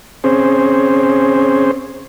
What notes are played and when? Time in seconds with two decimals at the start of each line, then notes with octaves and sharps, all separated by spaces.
0.24 C4 C#4 G#4 C5